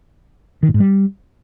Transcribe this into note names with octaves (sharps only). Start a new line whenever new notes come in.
D#3
A2
G#2
G3